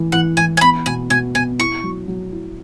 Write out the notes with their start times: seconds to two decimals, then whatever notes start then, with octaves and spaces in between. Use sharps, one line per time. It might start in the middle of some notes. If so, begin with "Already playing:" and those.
Already playing: E3 E4
0.12 E3 F#5
0.37 E3 G#5
0.57 G#5
0.61 B3 B5
0.86 B2 G#5
1.10 B2 G#5
1.35 B2 G#5
1.59 E4 C#6
1.83 F#3
2.08 F#3
2.32 E4